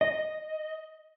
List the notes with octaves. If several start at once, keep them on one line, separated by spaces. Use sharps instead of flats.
D#5